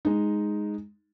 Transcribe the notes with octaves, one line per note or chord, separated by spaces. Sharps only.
G#3 D#4